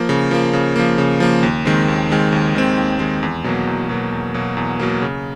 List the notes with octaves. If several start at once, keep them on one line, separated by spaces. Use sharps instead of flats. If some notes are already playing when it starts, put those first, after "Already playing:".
Already playing: F3 A#3
C#3
F3 A#3
C#3
F3 A#3
C#3
F3 A#3
D#2
D#3 G#3 C4
D#2
D#3 G#3 C4
D#2
D#3 G#3 C4
D#2
D#3 G#3 C4
E2
B2 F#3 A#3
E2
B2 F#3 A#3
E2
B2 F#3 A#3
E2
B2 F#3 A#3
C#3